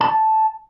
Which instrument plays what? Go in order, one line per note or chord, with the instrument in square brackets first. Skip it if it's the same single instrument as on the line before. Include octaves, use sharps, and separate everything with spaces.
[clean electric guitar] A5